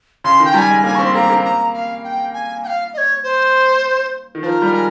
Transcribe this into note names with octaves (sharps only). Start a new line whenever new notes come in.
C#3 C6
D#3 G5
G3 G#5 A#5
G#3
A#3 G#5
C4 C#6
C6
A#3 A#5
A#3
A#5
F5
G5
G#5
G5
F5
D#5
C#5
C5
D#3
F3 A#4 C5
G3
G#3